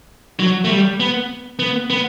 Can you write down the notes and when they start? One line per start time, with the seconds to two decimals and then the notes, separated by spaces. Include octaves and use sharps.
0.40 F#3
0.65 A3
0.69 G3
1.00 B3
1.59 B3
1.90 B3